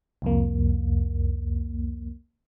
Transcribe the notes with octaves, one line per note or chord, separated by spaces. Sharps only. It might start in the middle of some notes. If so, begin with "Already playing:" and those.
C2 F2 A#3